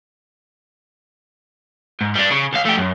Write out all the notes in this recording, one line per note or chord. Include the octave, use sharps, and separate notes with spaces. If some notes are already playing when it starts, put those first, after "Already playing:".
G#2
G3 D4
C#3
C#2 F5
A3 G4
F#2